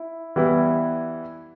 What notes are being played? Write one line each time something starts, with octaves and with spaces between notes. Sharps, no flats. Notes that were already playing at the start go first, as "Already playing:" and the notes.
Already playing: E4
E3 G3 B3 E4